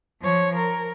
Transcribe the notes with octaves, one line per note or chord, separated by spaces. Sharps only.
F3 C#5
A#4